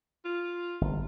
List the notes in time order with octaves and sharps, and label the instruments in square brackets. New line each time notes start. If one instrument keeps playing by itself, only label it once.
[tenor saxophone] F4
[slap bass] G1